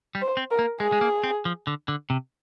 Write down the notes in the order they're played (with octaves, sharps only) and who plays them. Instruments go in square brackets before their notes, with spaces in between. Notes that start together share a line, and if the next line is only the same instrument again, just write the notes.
[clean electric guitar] G3
[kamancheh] C5
[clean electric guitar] C4
[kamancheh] A#4
[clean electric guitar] A#3
[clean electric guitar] G#3 [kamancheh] G#4
[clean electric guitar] G#3
A#3
C4
F3
D3
D3
C3